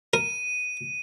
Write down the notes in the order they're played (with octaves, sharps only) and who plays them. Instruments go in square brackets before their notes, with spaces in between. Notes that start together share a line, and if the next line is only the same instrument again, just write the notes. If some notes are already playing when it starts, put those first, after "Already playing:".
[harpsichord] A#4 [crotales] D#7